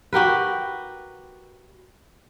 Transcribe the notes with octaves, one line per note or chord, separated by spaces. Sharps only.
F#4 G4 A#4 B4